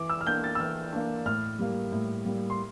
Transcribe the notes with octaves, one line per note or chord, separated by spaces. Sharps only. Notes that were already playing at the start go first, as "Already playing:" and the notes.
Already playing: E3 D6
E6
F6
A#3 D4 G6
A6
E6
E3 F6
A#3 D4
A2 F6
G3 A#3
A2
G3 A#3
C6